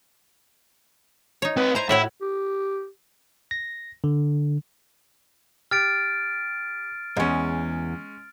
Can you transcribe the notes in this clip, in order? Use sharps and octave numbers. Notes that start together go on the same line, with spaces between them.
D#4 C#5
C4 B4
E4 C5 G#5 A#5
A2 E4 F#4 C#5
G4
A#6
D3
G4 F6 A6 D7
E2 G#2 G#3 C#4